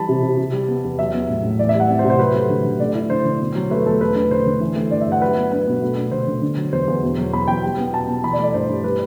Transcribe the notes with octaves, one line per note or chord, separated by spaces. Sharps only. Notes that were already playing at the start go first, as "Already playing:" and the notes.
Already playing: E3 G3 A5 B5
C3
C3
C3
G3
B3
E2
F#3 E5
B3
A2
A2
E3 D5
E5
G3
F#5
C4
C5
C3
C5
F#3 B4
A3
D3
D3
A3 D5
E4
D3 C5
D3
B2
F#3
A3 B4
E2 A4
A3 B4
D4 B4
D3 C5
D3
E3
A3
G2 D5
E5
G2
F#5
F#3 B4
B3
D4 B4
B2
A3
D4
D3 C5
D3
D3
F#3
E2 C5
E2
B2
F#3
E2 B5
E2 G5
G3
B3
B2 A5
B2
E3 B5
D5
A3
D5
G2 C5
G2
G3 B4